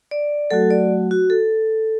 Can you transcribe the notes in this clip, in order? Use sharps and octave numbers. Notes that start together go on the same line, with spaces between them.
D5
F#3 A3 F#4 A4
D5
F#4
A4